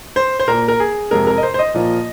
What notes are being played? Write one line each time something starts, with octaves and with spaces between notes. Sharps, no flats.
C5
C5
A#2 A#3 A#4
A#4
G#4
F2 C3 G#3 A#4
A#4
D#5
C5
C5
D#5
A#2 F3 A#3